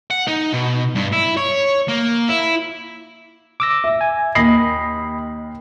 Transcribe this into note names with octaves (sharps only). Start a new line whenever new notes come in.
F#5
D#4
B2
G2
E4
C#5
A#3
E4
D6 E6 A#6
E5
G#5
D#2 D#5 B5 A#6 C7